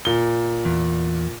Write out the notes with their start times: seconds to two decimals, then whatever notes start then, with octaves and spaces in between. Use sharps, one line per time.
0.05 A#2 G7
0.65 E2